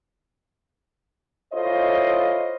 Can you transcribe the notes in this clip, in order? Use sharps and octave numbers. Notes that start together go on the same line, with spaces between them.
E4 F4 A4 C5 C#5 D#5